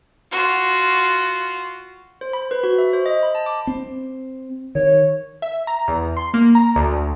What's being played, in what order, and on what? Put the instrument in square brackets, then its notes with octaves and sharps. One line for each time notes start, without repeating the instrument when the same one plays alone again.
[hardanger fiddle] F4 F#4
[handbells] C5
B5
B4
F#4
E5
C5
D#5
B5
A5
D6
[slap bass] C4
[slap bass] D#3 [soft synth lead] C#5
[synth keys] E5
A#5
E2
C6
A#3
A#5
D2